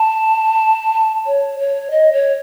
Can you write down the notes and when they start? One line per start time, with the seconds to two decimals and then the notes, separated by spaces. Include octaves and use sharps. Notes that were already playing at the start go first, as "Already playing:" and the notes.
Already playing: A5
1.26 C#5
1.59 C#5
1.91 D#5
2.13 C#5